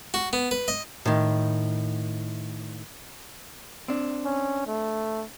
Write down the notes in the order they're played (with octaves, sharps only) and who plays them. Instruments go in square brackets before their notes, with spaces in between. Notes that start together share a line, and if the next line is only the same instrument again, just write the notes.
[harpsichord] F#4
B3
B4
D#5
[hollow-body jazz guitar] A2 D#3
C4 D4
[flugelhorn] C#4
A3